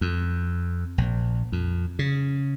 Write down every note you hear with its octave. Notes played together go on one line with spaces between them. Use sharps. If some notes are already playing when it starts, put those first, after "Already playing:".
F2
A#1
F2
C#3